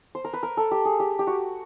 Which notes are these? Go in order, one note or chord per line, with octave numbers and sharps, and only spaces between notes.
C5
A#4
B4
A#4
A4
G4
G#4
G4
G4
F#4